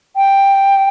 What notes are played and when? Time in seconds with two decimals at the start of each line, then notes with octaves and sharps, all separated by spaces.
0.16 G5